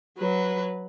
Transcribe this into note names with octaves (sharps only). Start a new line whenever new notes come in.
F#3 B4